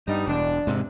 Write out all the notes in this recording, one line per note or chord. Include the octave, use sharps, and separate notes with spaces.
G2 G3 B3 D#4
E1 D4
G#2 C3